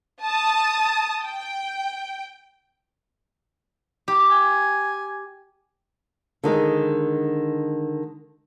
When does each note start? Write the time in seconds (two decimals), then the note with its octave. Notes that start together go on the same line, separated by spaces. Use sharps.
0.23 A5 D#6
1.24 G5
4.08 G4
4.31 G#5
6.43 D3 D#3 G#3